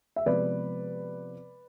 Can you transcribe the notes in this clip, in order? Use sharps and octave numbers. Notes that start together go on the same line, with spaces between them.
E5
C3 F3 G#3 B3 B4 D5